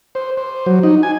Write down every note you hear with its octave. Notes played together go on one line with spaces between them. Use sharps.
C5
C5
F#3
D#4
G#5